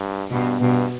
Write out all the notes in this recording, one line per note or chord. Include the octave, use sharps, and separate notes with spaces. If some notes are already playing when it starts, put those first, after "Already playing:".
Already playing: G2
G2 B2
G2 B2